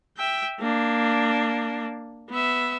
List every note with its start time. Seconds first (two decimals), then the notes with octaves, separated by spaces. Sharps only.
0.17 E5 G5
0.60 A#3 D4
2.30 B3 E5